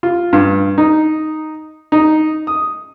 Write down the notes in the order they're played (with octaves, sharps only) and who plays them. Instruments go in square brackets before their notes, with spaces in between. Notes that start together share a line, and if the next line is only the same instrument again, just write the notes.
[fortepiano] F4
G2
D#4
D#4
D#6